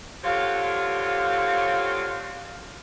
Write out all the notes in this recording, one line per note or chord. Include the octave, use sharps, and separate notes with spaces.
D3 C4 F4 G4 C#5 F5